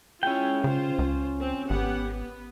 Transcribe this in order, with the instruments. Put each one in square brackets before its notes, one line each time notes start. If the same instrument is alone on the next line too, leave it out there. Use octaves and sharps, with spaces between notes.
[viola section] G#3 E4 F4 [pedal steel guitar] C#4 G5
[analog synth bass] C#3 [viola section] F4 C5
[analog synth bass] C#2
[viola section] C4
[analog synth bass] G#1 [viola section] B3 G4 F#5
[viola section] B3